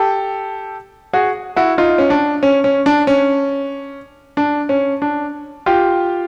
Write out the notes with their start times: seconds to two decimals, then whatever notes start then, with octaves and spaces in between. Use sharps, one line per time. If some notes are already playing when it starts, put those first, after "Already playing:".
Already playing: G4 A4
1.13 F#4 G#4
1.56 E4 F#4
1.78 D#4 F4
1.98 C#4
2.10 D4
2.43 C#4
2.64 C#4
2.86 D4
3.07 C#4
4.37 D4
4.69 C#4
5.02 D4
5.66 F4 G4